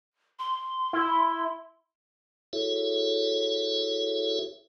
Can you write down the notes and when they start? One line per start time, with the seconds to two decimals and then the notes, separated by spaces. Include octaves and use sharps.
0.39 C6
0.93 E4
2.53 E4 F#4 G#4 A4 C#5 E5